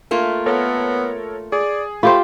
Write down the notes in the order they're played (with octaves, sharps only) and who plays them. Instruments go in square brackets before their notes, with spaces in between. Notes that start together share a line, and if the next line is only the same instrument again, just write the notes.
[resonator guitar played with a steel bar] A3 A#3 F4
[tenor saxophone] B3 [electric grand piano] A4 A#4 C#5
[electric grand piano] G#4 [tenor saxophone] D5
[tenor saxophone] A3 [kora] F4 G4 C5 [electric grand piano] B5